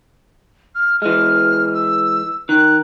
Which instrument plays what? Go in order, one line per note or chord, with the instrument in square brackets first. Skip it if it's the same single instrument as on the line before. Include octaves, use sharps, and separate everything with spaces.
[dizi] F6
[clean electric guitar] E3 G#3 [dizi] F6
[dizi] E6
[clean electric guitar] D#3 [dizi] F#6